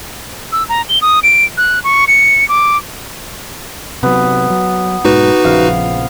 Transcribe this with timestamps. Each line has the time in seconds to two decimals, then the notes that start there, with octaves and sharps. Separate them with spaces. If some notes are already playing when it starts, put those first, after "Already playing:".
0.52 E6
0.69 A#5
0.89 G7
1.02 D#6
1.23 D7
1.57 F#6
1.84 C#6
2.08 C#7
2.49 D6
4.03 C3 F#3 B3
4.50 F#3
5.05 G#2 B2 D#4 F#4 B4
5.44 A#1 C#3 F3 F5